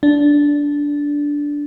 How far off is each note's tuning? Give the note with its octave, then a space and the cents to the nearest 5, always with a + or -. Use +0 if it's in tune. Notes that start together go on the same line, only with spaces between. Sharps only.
D4 -10